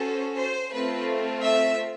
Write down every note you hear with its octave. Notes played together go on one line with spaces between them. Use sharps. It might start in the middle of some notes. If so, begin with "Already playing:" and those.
Already playing: C#4 F#4 A4 C5
C5
A3 C4 F4 B4
E5